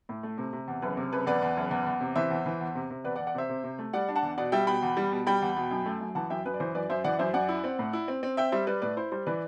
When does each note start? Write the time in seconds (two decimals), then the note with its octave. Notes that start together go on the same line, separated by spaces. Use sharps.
0.09 A2
0.23 A3
0.38 C3
0.53 C3
0.68 E2
0.82 F#1 B4
0.97 C3
1.12 F#1 B4
1.27 E2 B4 D5
1.42 E2
1.57 F#1
1.71 E2
1.86 E2
2.00 C3
2.16 E3 C5 E5
2.31 E2
2.46 E3
2.61 E2
2.75 C3
2.90 C3
3.04 E2 B4 D5
3.16 D5 F#5
3.20 E2
3.27 D5 F#5
3.35 C3 C5 E5
3.49 C3
3.64 C3
3.79 A3
3.93 G3 D5 F#5
4.09 D4
4.15 F#5 A5
4.23 E2
4.38 B2 D5 F#5
4.52 G3 E5 G5
4.67 B2 G5 B5
4.83 E2
4.97 G3
5.12 B2
5.27 G3 G5 B5
5.42 E2
5.57 B2
5.71 F#2
5.86 A3
6.00 F#2
6.15 E3 F#5 A5
6.30 F#2 E5 G5
6.45 F#2 B4
6.54 D5
6.60 E3 C5
6.74 F#2 B4 D5
6.89 F#2 C5 E5
7.04 E3 D5 F#5
7.19 F#2 C5 E5
7.33 F#2 D5 F#5
7.49 E4
7.64 C4
7.79 A2
7.93 E4
8.08 C4
8.23 C4
8.37 C4 E5 G5
8.52 G3 C5 E5
8.67 G3 B4 D5
8.82 A2 B4 D5
8.97 E4 C5
9.12 G3 C5
9.26 E3 B4 D5